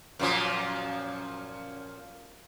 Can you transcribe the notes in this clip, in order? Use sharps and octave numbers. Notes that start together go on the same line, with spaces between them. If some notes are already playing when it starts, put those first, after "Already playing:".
F#2 A#2 F3